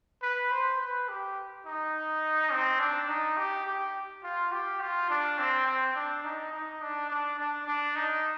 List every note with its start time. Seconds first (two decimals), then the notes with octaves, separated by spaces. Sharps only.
0.22 B4
0.51 C5
0.80 B4
1.09 G4
1.65 D#4
2.52 C4
2.80 D4
3.09 D#4
3.37 G4
3.66 G4
4.23 F4
4.52 G4
4.81 F4
5.10 D4
5.38 C4
5.66 C4
5.95 D4
6.24 D#4
6.53 D#4
6.81 D4
7.10 D4
7.39 D4
7.67 D4
7.96 D#4